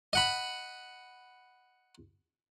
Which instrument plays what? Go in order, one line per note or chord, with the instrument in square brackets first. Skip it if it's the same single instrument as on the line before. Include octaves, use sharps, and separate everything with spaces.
[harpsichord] D#5 F#5 B5